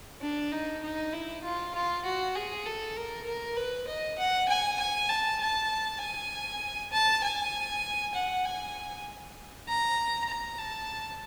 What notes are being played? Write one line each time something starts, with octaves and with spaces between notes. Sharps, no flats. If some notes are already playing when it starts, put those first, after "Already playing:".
D4
D#4
D#4
E4
F4
F4
F#4
G#4
A4
A#4
A#4
B4
D#5
F#5
G#5
G#5
A5
A5
G#5
A5
G#5
F#5
G#5
A#5
A#5
A5